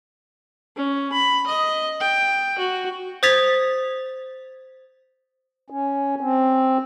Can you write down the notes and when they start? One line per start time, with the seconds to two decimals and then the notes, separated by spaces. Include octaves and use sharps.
0.77 C#4
1.13 B5
1.47 D#5
2.01 G5
2.59 F#4
3.23 C5 D#6 G#6 A6 B6 F7
5.70 C#4
6.21 C4